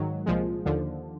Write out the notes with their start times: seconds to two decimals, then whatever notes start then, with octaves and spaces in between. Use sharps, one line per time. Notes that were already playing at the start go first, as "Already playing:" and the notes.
Already playing: G#2 D#3 F#3
0.26 C2 A#2 F3 G#3
0.65 D#2 D3 F3